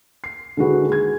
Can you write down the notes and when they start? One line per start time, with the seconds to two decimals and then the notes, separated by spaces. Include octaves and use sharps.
0.24 C7
0.57 D3 D#3 G#3 E4 F#4 B4
0.89 G#3 G#6